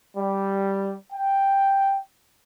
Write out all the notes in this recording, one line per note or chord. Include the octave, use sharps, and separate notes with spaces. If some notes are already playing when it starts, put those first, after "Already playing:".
G3
G5